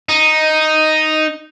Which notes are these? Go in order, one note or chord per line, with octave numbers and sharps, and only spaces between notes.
D#4